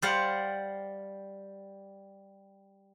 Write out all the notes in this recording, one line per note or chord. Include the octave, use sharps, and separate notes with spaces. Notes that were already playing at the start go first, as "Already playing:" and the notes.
G3 C5 D5 F5 F#5